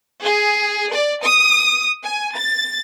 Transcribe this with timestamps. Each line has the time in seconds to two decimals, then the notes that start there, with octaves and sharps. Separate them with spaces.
0.22 G#4
0.91 D5
1.23 D#6
2.03 G#5
2.36 A6